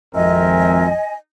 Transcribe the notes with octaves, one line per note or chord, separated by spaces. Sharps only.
G#1 F2 C4 A#4 D#5 E5 G#5